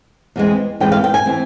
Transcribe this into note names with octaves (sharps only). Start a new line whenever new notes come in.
E2 E3 G#3 C4
E2 E3 G#3 C4 G5
F5
G5
G#5
E3 G#3 C4